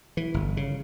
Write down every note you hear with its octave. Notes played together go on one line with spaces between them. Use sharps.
E3
G1
C#3